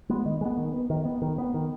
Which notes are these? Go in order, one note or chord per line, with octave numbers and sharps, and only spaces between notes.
G#3 B3
D#3
G#3
B3
D#3
B3
D#3
B3
D#3
B3
D#3